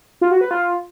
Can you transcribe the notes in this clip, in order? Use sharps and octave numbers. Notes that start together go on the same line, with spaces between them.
F4
F#4
B4
F4